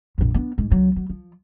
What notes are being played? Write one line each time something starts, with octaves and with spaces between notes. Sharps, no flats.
A#1 F2
B3 D4
G#2 G#3
C#2 F#3
F#3
F3